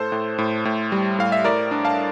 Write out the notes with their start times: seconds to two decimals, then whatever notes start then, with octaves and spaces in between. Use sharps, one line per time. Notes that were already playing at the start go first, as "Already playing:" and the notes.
Already playing: A2 A4 C5
0.12 A2
0.38 A2
0.65 A2
0.92 G3
1.19 A2 F5
1.32 E5
1.45 A2 A#4 D5
1.71 D4
1.85 F5 A5